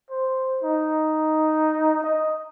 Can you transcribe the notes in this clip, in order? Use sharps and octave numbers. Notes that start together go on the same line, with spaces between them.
C5
D#4
D#5